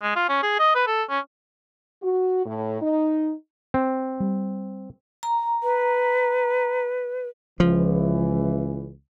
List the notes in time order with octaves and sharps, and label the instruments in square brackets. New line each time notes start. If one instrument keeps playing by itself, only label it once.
[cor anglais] G#3
F4
C#4
G#4
D#5
B4
A4
C#4
[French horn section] F#4
A2
D#4
[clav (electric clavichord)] C4
[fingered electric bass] G3
[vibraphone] A#5
[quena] B4
[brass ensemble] C#2 E3 [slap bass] F3